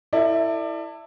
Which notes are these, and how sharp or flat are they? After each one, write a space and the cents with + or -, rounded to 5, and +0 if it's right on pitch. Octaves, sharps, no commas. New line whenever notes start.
E4 +0 A4 +30 D5 +25